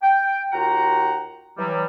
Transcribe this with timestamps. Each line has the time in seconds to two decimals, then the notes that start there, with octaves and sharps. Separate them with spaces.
0.03 G5
0.52 D#2 F4 F#4 F#5 G5 A#5
1.58 E3 F#3 G3